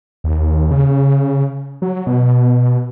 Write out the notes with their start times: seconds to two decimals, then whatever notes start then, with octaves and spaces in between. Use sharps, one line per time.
0.24 D#2
0.71 C#3
1.82 F#3
2.07 B2